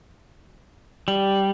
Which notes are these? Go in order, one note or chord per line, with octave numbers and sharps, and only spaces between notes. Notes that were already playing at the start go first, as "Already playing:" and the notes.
G3